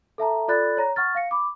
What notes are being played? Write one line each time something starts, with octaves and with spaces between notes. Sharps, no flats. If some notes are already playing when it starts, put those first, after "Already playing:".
A4 E5 A5 A#5
F4 A4 D5 B5 F#6 A6
C#5 A#5 A#6
F#5 C#6 F6 A6
F5 A#6 C#7
B5 D6